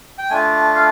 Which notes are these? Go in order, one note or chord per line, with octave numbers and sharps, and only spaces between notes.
G5
A3 D4 F4 G#5
F5